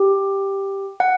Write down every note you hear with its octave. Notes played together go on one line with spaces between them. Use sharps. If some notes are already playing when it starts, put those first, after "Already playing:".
Already playing: G4
F#5